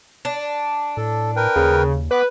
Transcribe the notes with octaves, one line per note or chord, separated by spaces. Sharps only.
D4
A2 A4
A#4 B4 G5
D#2 C#3
B3 B4 D6